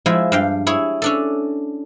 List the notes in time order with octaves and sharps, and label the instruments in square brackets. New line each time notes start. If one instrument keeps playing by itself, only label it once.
[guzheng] F3 G#3 E4
G2 F5 G5
E4 G#4 C#5
C#4 D4 A4